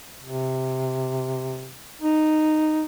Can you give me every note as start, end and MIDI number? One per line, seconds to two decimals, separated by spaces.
0.24 1.73 48
2.01 2.85 63